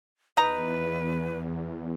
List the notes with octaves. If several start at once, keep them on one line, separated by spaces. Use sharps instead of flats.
E2 D#4 B4 A#5